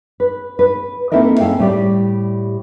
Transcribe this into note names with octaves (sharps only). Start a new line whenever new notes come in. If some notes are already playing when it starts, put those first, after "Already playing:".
B4
B4
A#3 C4 E4 A4 A#4 D#5
C#4 A4 F5 G5
A2 G3 G4 D5